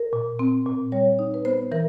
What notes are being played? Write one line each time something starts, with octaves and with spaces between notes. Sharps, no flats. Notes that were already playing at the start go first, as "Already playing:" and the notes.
Already playing: A#4
A#2
C4
A#2
G3 C#5
D#4
B4
B3 C5
E3 A#4